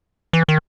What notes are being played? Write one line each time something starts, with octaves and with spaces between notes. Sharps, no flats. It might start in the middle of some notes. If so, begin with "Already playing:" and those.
E3
D#3